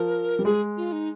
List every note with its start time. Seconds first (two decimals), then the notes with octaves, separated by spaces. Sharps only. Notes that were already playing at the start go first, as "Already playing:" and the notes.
Already playing: F3 A#4
0.39 G3
0.45 G#3 G#4
0.77 F4
0.92 D#4